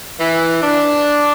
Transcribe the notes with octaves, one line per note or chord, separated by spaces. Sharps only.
E3
D4